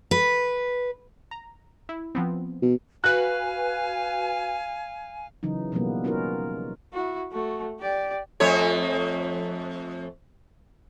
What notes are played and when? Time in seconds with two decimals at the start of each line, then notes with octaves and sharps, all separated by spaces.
0.11 B4
1.31 A#5
1.89 E4
2.15 F3 B3 C4
2.62 B2
3.04 F#4 B4 F5 G#5 F#6
5.43 C#3 E3 F#3 D#4
5.72 B2 E3 F3 G3 A#3 B3
6.04 C#4 D#4 F4 F#4 A#4
6.93 E4 F#4
7.32 A3 F#4
7.80 G4 D5
8.40 F2 A3 C#5